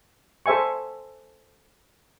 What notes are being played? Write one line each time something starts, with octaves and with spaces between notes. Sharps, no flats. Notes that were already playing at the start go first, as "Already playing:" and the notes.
A4 C5 E5 G#5 C#6